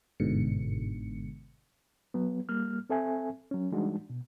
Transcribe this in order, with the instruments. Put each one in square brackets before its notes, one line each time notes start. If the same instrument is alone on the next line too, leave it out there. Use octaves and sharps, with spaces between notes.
[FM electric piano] G1 G#2 B2 D3 C#7
[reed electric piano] F#3 B3
G3 A#3 F6
C4 A4 E5 G#5
F#3 C#4
E3 G3 G#3 D4 D#4 F#4
B2